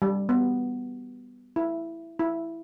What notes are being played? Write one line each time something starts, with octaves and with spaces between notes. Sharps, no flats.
G3
B3
E4
E4